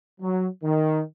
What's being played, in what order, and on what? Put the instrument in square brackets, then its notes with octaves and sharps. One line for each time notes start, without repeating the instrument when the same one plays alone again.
[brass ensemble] F#3
D#3